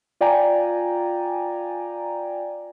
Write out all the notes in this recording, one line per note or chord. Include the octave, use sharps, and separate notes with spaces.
F4 D5 G5 G#5 A#5